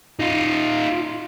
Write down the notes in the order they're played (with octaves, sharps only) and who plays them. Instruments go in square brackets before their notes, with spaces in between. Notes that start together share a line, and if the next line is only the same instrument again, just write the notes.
[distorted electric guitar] D#4 F4